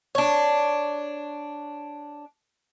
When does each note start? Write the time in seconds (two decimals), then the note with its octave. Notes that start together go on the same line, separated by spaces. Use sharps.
0.15 D4 C#5